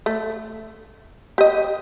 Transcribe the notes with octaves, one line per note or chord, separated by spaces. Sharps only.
A3
G4 D#5